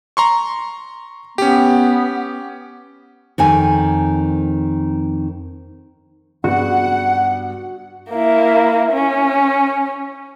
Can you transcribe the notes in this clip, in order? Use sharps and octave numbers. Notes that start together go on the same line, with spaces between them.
A#5 C6 C#6
B3 C#4 G4
F2 D#3 A#3 G#5
G2 B3 F#4 F#5
A#3 E4
C#4